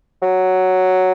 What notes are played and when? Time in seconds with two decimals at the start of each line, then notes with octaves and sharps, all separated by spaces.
0.22 F#3